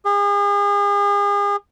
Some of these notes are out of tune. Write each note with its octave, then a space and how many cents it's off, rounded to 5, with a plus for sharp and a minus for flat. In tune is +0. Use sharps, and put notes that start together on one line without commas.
G#4 -40